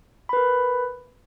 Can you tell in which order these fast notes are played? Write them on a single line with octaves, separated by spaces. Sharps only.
B5 B4 A#4